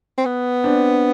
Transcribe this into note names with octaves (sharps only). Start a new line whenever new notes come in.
C4
B3
C4 D4